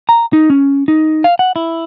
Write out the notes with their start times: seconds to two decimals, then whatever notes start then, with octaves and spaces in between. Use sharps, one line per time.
0.09 A#5
0.33 D#4
0.50 C#4
0.88 D#4
1.24 F5
1.39 F#5
1.56 E4